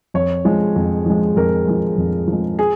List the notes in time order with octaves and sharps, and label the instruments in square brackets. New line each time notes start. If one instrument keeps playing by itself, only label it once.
[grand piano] F2 C#5
F3 G#3
F2
F3 G#3
F2 A#4
F3 G#3
F2
F3
G#3
G#4